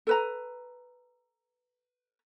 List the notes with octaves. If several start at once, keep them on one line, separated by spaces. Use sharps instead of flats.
A4 B4 A#5